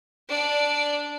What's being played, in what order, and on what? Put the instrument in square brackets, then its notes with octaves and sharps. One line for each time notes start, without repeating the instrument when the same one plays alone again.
[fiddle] D4 D5